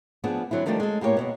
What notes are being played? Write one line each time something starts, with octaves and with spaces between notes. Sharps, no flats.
F3 B3 D4 G#4
D3 F#3 C4 E4
D#3 F3 G3 A3 D4
G#3 A4
A2 A#3 G4 A#4 C#5
D2 G#2 B2